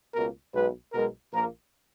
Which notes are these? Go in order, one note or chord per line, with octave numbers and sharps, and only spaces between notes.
C#2 B2 A#3 A#4
B1 B2 G#3 B3 B4
B1 B2 G#3 A#4
A#1 A#2 F3 A#3 A#4